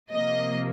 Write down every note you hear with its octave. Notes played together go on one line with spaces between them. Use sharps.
C3 F3 A#3 D#5